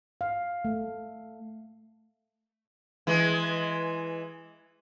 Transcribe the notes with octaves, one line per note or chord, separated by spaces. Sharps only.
F5
A3
E3 G#3